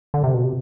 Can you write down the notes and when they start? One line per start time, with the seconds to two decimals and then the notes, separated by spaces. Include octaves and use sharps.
0.14 D3
0.24 C3
0.34 B2
0.44 C3